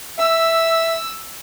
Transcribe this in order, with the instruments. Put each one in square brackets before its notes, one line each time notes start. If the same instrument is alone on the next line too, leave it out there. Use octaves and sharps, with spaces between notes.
[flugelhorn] E5 [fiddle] E6